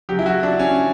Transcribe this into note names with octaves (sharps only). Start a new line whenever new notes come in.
C#3 F#3 G4
E4
F#4
D4
C#4